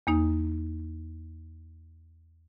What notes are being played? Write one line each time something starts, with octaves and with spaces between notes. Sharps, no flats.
E2 A#3 D#4